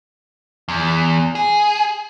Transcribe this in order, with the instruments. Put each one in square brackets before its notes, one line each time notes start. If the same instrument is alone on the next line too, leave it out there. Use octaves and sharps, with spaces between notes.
[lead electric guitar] E2
G#4